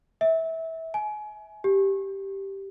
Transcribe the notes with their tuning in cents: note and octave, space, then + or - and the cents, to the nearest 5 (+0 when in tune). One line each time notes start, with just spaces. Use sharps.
E5 -20
G#5 +30
G4 -5